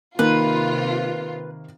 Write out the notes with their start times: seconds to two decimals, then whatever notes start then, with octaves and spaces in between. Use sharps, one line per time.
0.19 C3 D#3 A#3 F4 B4